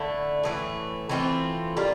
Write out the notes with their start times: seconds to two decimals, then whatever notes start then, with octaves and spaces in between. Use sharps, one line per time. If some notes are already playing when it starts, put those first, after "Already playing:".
Already playing: D3 A3 E4
0.43 A2 E3 A3
1.09 E3 A3 C4 F4
1.77 G3 A#3 F4